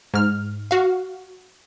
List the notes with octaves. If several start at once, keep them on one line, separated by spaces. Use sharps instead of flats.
G#2 F6
F#4 F5